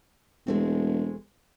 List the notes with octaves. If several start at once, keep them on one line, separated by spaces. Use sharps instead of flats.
E1 G#3 A3 C4